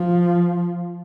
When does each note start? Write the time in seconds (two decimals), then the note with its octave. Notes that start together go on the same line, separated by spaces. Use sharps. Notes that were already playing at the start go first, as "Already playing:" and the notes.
Already playing: F3